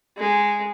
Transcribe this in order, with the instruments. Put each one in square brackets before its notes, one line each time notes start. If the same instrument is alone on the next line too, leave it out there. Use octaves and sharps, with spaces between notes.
[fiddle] G#3